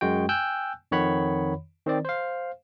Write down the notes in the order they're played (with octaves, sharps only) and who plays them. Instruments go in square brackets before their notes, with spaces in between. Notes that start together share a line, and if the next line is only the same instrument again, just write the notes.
[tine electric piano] F#2 G#3 F#4 G5
G5 G#5 E6 F#6 G6
F2 D#3 C#5 F#5 B5
D#3 C4 D5
C5 F5